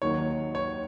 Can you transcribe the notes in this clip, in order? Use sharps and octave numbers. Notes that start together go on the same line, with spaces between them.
D#2 D#3 F#3 C#5
C#5